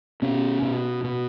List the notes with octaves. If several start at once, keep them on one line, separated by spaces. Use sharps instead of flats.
B2 C#4
B2
B2